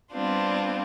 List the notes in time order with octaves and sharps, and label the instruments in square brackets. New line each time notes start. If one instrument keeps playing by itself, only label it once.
[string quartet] G3 B3 C4 D4 F4